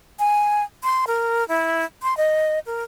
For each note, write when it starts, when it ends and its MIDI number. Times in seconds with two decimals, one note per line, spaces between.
0.20 0.64 80
0.83 1.05 84
1.07 1.47 70
1.49 1.85 64
2.03 2.17 84
2.17 2.59 75
2.66 2.83 70